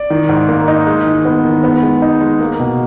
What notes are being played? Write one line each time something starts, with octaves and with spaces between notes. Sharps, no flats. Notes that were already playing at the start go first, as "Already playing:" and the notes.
Already playing: D5
D#3
G#2
A#3
D#4
G#3
D#3
B3
D#3
B3
G#3
D#4
G#3
A#3
B2